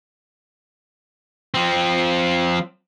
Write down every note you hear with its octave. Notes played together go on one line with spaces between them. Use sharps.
F3 C4